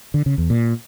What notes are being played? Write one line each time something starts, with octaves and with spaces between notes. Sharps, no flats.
D3
C#3
E2
A#2